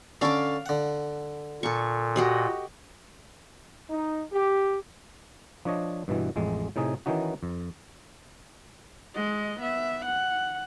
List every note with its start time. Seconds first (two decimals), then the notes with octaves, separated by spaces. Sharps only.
0.21 D3 C#4 A4 F5 D6
0.66 D3 F#5
1.63 A#2 A4 C#6
2.16 F#4 G4 D#5
3.90 D#4
4.33 G4
5.65 F3 D4 C#5 D#5
6.08 G2 B2 E3
6.36 A1 F2 G#3
6.76 A2 C3 D#4 G#4 G#5
7.06 D#3 E3 C#4 D#4 F#4
7.43 F2
9.15 G#3 D#5
9.60 B3 E5
10.06 F#5